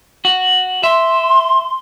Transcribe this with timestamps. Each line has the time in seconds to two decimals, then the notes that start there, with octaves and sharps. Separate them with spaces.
0.25 F#4
0.83 E5 C6